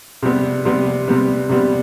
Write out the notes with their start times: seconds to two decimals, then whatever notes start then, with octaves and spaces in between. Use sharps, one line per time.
0.23 C3 G3 B3
0.65 C3 G3 B3
1.08 C3 G3 B3
1.49 C3 G3 B3